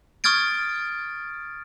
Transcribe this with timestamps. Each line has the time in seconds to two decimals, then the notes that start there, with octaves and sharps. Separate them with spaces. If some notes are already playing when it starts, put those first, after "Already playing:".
0.24 C#6 D#6 F6 G#6 A6 D7